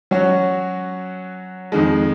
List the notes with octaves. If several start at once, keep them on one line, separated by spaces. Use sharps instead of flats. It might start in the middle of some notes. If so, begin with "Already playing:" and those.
F#3 C#4 F#4
F2 D#3 G#3